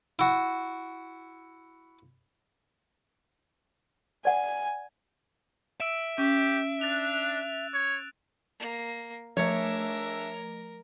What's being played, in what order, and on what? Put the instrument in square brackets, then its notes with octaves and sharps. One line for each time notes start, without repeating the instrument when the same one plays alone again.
[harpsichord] E4 F#4
[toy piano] D5 F#5 [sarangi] G#5
[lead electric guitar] E5 [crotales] E6 D7 E7
[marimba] C#4 [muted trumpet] G4
[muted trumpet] D4 [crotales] F#6 A6 F7
[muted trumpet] C#5
[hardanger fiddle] A#3
[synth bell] F3 A3 [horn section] D4 G#4 E5 [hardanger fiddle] A#4 [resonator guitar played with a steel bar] C#5